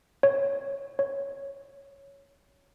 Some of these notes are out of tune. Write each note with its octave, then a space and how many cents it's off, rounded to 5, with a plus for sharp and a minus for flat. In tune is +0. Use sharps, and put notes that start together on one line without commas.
C#5 +5
C#5 +5